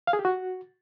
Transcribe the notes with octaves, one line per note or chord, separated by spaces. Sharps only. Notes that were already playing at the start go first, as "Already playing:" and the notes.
F5
G#4
G4
F#4